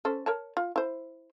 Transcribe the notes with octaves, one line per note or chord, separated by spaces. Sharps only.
C#4 A4 C5
A#4 C#5 A5
F4
E4 C5